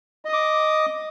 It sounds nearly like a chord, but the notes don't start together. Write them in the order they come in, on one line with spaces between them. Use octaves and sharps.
D#5 D#6 D6